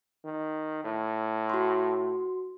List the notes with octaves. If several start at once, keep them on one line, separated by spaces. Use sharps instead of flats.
D#3
A2
F#4 C6